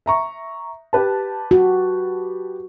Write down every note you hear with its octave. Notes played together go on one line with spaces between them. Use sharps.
E5 A#5 C#6
G4 B4 A5
F#4